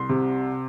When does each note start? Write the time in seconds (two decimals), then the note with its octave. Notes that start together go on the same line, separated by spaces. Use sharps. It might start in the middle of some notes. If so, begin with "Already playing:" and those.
Already playing: C2 C6
0.09 C3